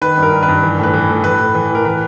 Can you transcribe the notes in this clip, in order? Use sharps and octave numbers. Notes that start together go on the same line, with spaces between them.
D#3 B4
G2
A#4
D#3
B4
G2
E3
A2 B4
E3
A2
E3 B4
A2
E3
A2 A#4
E3 B4